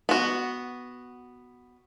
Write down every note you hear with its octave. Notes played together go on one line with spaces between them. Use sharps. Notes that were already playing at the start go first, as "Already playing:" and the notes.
B3 F#4